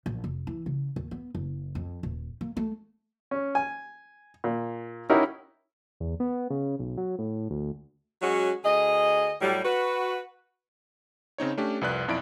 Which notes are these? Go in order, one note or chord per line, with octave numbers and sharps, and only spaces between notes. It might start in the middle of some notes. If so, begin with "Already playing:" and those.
A#1
F1
E3
C#3
D#2
B3
F#1
F2
D#1
A#3
A3
C#4
G#5
A#2
C#4 D#4 E4 F#4 G4 A#4
E2
B3
C#3
B1
F#3
A2
D2
F#3 G#3 C#4 F#4
D2 G#4 D#5
A2 F#3 G3
F#4 B4
C#3 C4 D#4 C#5
A3 C#4 D4 G4
C2 F2 B4 D5 F#6
B1 F2 E4 D5 B5 D7